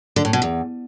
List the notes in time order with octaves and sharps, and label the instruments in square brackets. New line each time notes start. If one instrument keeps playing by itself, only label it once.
[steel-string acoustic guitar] D3
A2
B2
E2